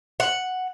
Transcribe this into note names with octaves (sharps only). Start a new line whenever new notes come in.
F#5